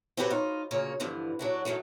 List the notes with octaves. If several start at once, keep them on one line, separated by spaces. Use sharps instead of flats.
C4 F#4 G4 A4 B4 C#5
D#4 F4
D2 A#2 C#3 A#3 C#5
G2 D3 E3 F3
F#3 D4 F#4
D#3 E3 F#3 A3